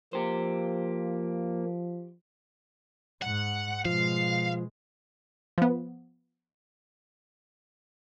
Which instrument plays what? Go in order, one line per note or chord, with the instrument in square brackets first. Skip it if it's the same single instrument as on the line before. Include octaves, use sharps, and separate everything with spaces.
[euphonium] F3 [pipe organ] A#3 [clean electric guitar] G4 C5
[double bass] G#2 [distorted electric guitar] F#5
[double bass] B2 G#3 [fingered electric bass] F3 [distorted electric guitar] F5
[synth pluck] F3 B3